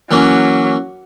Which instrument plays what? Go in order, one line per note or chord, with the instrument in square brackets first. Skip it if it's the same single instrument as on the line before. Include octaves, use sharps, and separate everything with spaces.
[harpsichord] E3 A#3 C#4 [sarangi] F#3